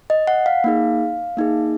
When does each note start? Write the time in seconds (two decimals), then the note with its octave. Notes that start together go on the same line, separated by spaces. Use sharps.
0.10 D#5
0.27 F#5
0.46 F5
0.64 A#3 D#4 G#4
1.37 A#3 D#4 G#4